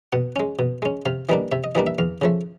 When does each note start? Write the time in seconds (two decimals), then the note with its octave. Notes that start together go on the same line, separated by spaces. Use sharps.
0.13 B2 F#5
0.36 G#3 C#4
0.59 B2
0.82 G#3 C#4
1.06 C3 F5
1.29 E3 G3 A#3 D4 D#5
1.52 C3 E5
1.64 D#5
1.75 E3 G3 A#3 D4 D#5
1.87 E5
1.98 E2 F5
2.22 C#3 F3 A3